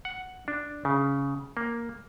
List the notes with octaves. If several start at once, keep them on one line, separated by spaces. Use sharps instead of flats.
F#5
D4
C#3
A#3